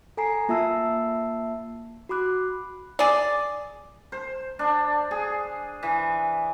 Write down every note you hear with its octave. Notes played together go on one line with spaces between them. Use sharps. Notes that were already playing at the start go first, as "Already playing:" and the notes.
A4 G#5 A#5 C7
A#3 F4 E5 A5 E6 C7
F#4 B5 D6 F#6
G#4 D5
C5
D4
G#4
E3